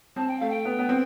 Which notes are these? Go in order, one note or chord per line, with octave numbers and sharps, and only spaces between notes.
C4 A5
G5
A3 F5
G5
B3
B3
C4